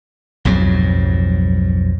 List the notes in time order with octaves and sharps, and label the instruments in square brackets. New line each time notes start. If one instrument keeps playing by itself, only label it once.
[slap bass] B1 F2 G#2 F#3